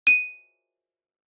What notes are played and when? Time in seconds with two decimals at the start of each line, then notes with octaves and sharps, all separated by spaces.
0.07 D#7